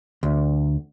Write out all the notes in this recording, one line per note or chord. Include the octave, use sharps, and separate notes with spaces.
D2